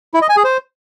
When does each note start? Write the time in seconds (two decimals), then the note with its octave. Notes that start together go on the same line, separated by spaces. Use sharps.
0.14 E4
0.22 D#5
0.29 G#5
0.37 G#4
0.44 C5